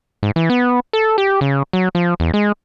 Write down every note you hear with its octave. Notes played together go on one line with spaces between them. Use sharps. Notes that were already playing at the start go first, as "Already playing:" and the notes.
G#2
E3
B3
A4
G4
C#3
F#3
F3
E2
G#3